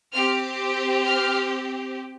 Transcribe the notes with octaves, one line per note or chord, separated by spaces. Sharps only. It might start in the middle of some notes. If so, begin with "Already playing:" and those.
C4 G4 F6
F6